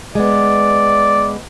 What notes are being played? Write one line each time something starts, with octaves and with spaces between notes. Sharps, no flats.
G#3 B3 D5